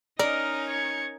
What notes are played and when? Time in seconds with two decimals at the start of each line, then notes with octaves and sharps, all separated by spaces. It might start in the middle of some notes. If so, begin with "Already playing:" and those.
0.19 C#4 D#4 A#4 D5 D#5
0.69 G#6 C#7